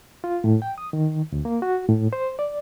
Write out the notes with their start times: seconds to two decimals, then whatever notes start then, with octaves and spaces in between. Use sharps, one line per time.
0.24 F4
0.44 A2
0.62 G5
0.78 D#6
0.93 D#3
1.32 D2
1.45 A#3
1.62 F#4
1.89 A2
2.13 C5
2.39 D5